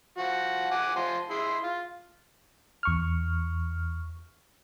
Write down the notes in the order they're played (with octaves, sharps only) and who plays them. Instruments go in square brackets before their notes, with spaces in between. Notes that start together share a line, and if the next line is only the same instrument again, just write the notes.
[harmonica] F3 F#4
F#5 G#5 D6
F3 G#5 C6
E4 G#4 C6
F4
[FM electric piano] E2 C#6 F6